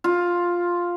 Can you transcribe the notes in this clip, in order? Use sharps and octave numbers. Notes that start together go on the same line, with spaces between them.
F4